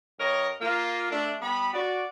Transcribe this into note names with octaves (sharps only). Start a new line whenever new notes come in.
G2 A#4 C#5 D#5
A#3 F4
A3 D4
G3 B3 B5
F#4 D5